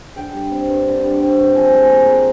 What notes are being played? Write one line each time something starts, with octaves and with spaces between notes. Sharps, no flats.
D3 G5
G3
C4
G2
D3
G3
C4
G2
F3 G#5
G#3 G#5
G#5
A#2 A#5
A#2 C6